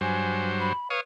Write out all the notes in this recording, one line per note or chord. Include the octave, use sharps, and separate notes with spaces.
G2 F#3 C5 G#5
B5
B4 C#5 F5 D#6